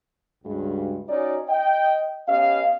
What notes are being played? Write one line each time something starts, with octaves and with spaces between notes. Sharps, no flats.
C#2 G2 G#3 F#4
C#4 D#4 F#4 C#5 D5
D#5 G5
B3 C#4 G4 D#5 F5